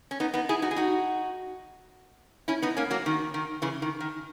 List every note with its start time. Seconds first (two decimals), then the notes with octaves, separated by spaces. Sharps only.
0.11 C#4
0.20 B3 D#4
0.34 B3 D#4
0.49 E4 G#4
0.62 D#4 F#4
0.71 G#4
0.76 D#4 F#4
2.48 C#4 E4
2.62 B3 D#4
2.77 A#3 C#4
2.91 F#3 A#3
3.06 D#3
3.34 D#3
3.62 C#3 E3
3.82 D#3
4.00 D#3